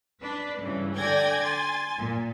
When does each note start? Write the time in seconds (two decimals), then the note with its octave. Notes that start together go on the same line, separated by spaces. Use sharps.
0.21 D4 B4
0.60 G2 C#3 E3
0.96 D3 D5 G5 G#5 G#6 A#6
1.40 G#5 C6 A6
1.96 A#2